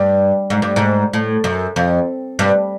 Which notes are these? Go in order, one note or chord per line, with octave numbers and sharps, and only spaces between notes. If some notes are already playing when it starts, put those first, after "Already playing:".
Already playing: G2
G#2
G2
G#2
A2
F#2
F2
G2